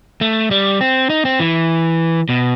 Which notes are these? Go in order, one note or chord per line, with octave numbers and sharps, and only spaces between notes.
A3
G3
C4
D#4
C4
E3
B2